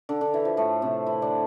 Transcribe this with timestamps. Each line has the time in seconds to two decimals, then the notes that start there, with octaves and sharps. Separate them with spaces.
0.09 D3
0.21 D3
0.34 E3
0.45 F3
0.57 A2 A3
0.82 C3 C4
1.06 E3 E4
1.22 D3 D4